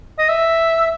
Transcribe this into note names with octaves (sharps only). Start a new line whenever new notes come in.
D#5
E5